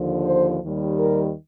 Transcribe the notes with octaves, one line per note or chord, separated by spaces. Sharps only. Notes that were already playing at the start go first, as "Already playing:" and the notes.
Already playing: D#2 D3 F3
C5
D#2 D#3 G3
A#4